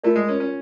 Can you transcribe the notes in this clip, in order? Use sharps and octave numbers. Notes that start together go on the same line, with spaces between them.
A3 F4 A#4 D5
G#3
C#4
C#4